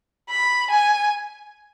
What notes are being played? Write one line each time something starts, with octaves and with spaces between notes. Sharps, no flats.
B5
G#5